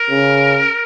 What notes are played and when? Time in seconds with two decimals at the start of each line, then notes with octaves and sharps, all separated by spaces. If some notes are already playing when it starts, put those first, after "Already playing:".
Already playing: A#4
0.10 C#3